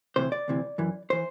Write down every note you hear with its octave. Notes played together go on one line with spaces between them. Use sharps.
D2 C3 E3 C5
D5
D2 C3 E3
F#2 E3
E3 C5